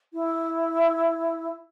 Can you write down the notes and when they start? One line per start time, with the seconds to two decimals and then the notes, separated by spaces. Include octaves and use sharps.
0.13 E4